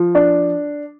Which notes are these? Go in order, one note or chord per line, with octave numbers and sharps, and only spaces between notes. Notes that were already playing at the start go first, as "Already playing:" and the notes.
Already playing: F3
D4